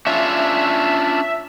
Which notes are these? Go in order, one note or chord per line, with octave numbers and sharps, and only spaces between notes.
C#4 D4 F4 E5